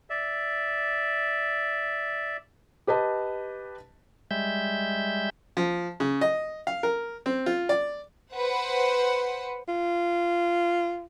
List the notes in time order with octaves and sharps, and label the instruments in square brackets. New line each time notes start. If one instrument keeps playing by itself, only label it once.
[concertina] D5 E5
[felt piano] G4 B4 D#5 A5
[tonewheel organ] G3 G#3 E5 G6
[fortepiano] F3
C#3
D#5
F5
A#4
C4
F4
D5
[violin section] B4 C5 F#5
[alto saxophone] F4